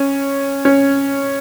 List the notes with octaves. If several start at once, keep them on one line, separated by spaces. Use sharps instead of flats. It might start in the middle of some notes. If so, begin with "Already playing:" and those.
Already playing: C#4
C#4